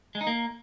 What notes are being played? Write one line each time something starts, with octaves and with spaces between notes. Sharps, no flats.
G#3
D#4
A#3